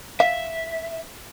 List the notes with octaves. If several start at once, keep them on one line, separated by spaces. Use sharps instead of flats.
E5 F5